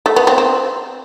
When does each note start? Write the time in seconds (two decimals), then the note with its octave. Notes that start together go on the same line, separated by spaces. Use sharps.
0.06 A3
0.16 B3
0.27 C4
0.38 C4